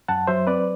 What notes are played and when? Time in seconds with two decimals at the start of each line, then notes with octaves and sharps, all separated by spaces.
0.08 F#2 F#5 A5
0.27 F#3 C5 E5
0.47 C4 B4 D5